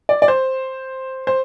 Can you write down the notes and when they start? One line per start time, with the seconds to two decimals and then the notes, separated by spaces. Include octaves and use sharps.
0.09 D5
0.22 D5
0.28 C5
1.27 C5